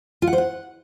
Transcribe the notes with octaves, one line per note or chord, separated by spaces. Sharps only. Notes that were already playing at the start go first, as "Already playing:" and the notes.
F4
F#5
C5
F#5